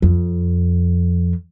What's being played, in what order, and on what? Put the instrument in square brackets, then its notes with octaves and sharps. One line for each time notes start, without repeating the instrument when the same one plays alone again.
[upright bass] F2